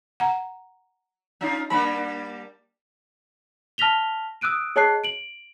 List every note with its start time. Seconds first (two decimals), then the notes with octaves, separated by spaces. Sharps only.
0.20 F#5 A#5
1.41 C#4 D#4 F4
1.70 G3 A#3 D4 B5
3.78 A5 F6 A#6 B6 F7 G7
4.41 D#6 E6 F#6 D7 D#7
4.76 G#4 C#5 D#5 A5 F#6 C7
5.04 D7 F#7